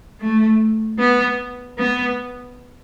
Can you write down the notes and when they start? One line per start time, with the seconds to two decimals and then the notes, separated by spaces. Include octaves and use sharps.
0.21 A3
0.99 B3
1.78 B3